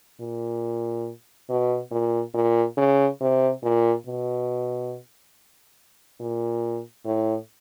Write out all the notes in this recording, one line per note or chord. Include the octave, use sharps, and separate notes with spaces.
A#2
B2
A#2
A#2
C#3
C3
A#2
B2
A#2
A2